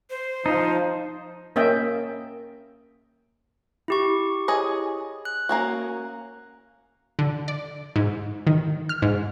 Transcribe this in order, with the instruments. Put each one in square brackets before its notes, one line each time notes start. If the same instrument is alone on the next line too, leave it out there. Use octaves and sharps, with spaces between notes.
[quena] C5
[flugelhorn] F3 [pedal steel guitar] D#4
[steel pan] A#3 C#4 D#5 E5 G5
[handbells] E4 G4 C#6
[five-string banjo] G#4 C#5 D#5
[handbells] F#6
[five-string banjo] A#3 C#4 F#4
[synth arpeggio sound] D3
D5
G#2
D#3
F6
G#2